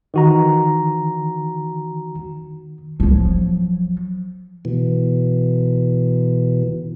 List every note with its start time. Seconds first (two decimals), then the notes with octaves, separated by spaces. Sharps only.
0.14 D#3 E3 F#4 A#5
3.00 F3 F#3
4.65 B2 E3